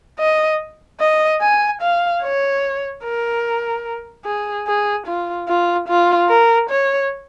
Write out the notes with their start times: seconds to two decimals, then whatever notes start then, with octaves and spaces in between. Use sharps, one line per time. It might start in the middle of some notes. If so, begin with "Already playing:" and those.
0.19 D#5
1.00 D#5
1.41 G#5
1.82 F5
2.23 C#5
3.04 A#4
4.25 G#4
4.67 G#4
5.07 F4
5.48 F4
5.88 F4
6.29 A#4
6.70 C#5